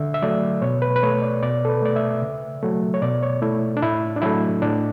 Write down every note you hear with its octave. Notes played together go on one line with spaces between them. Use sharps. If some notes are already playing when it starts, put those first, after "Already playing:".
Already playing: D3 E5
E5
F#3 A3 D5
B2 C#5
B4
B4
A3 C#5
D5
B2 D5
A4
B4
A3 D5
E5
C#3
F#3 A3
C#5
B2 D5
C#5
A3 E4
D4
A2 E4
D4
F#3 A3 E4
A2 D4